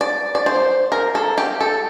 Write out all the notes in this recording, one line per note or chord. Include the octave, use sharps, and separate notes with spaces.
D5
D5
C5
A#4
A4
G4
A4